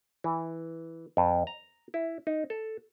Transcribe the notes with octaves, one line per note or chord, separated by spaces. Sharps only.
E3
F2
A#5
E4
D#4
A4